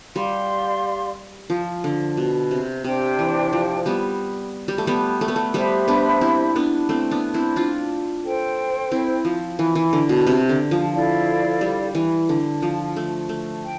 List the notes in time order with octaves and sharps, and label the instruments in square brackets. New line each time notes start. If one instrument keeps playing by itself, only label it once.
[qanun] G3 [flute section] G4 D5 F5 C6
[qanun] F3
D3
B2
C3
[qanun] C3 [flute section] D4 G4 C5 G5
[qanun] E3
F3
G3 B3
G3
A3
G3 B3
A3
B3
A3
[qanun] G3 B3 [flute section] G4 C5 E5 B5
[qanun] B3 D4
C4 E4
B3 D4
A3 C4
B3 D4
C4 E4
D4 F4
[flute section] A4 C5 G5
[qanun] C4 E4
F3
E3
E3
D3
B2
C3
D3
F3
[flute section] E4 A4 D5 F5
[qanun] G3
E3
D3
F3
A3
A3
[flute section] G5